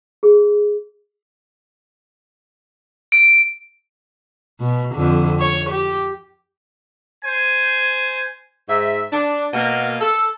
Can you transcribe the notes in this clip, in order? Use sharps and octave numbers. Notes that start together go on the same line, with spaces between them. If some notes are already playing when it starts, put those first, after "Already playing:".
G#4
D7
B2
F2 D3
C#5
G4
C5 G#5
G#2 E5
D4
B2 A#3
A4